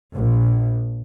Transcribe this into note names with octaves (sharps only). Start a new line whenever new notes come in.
A#1